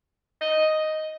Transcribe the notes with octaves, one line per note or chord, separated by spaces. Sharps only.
D#5